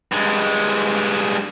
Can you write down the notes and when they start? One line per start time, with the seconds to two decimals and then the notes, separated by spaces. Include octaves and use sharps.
0.12 G2 G#3